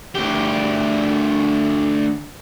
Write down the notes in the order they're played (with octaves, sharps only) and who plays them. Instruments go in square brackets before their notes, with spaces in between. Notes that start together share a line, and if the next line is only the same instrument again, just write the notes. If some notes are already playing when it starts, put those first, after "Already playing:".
[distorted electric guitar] D2 G4